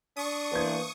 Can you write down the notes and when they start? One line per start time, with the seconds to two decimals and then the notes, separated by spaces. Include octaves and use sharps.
0.17 D4 C#6 D#6
0.52 E3 A#3 B3 C5 G#6